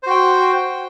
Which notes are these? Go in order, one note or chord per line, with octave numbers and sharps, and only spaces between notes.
F#4 C5 G5